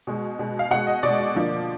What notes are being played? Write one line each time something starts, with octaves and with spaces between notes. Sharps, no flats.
B2 G#3
B2 G#3
F5
B2 G#3 F#5
D#5
B2 G#3 D5
D3 F3 A#3